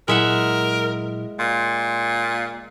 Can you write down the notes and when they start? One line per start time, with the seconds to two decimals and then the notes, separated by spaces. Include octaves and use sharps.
0.08 A#2 F#3 G#3 E4 A#4 E5 F#5
1.39 A#2 C6